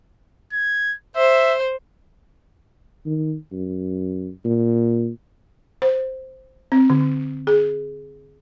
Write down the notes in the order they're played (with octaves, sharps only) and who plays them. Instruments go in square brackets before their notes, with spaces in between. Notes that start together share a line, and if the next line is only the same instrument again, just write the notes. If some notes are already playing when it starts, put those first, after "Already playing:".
[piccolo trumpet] G#6
[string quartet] C5 [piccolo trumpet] E5
[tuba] D#3
F#2
A#2
[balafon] C5
C4
D3
G#4